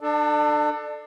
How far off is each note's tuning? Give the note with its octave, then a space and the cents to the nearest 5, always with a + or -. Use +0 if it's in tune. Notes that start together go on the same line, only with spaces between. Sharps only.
D4 +30 A4 +0